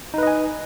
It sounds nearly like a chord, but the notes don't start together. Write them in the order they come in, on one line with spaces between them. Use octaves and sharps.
D#4 B4 D#5 G#5